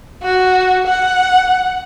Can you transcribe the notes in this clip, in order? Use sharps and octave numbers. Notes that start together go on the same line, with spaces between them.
F#4
F#5